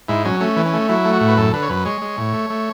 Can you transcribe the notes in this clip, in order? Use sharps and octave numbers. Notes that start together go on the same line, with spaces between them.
G#2 E4
F#3 C#4
A3 C#4
E3
C#4
A3
F#3 E4
A3
F#4
A2
B4
F#2 A4
D3 B4
C#5
F#2 B4
G#3 C#5
G#3
A2
A3
A3